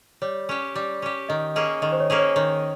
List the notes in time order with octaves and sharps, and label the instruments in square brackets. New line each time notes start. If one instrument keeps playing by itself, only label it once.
[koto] G3 [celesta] C#5
[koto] C#4 G4
G3
C#4 G4
[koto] D#3 [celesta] D#5
[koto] A#3 C#4 G#4 [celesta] D#5
[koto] D#3 [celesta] D#5
[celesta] C5
C#5
[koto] A#3 C#4 G#4
[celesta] C#5
[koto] D#3 [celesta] C#5